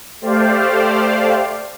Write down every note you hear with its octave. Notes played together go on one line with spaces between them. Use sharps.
A3 G4 C5 D5 F5